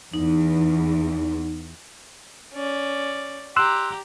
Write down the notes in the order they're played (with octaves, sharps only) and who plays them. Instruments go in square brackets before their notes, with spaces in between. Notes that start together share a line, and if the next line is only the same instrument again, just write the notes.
[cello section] E2 [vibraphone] D#4
[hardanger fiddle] C#4 D5
[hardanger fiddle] G4 A#5 [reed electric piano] C6 E6 F#6